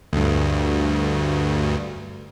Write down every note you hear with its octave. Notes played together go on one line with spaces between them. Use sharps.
D2 G2